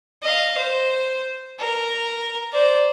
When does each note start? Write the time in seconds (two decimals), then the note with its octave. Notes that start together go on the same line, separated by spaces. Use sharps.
0.23 D#5 F5
0.57 C5
1.59 A#4
2.52 C5 D5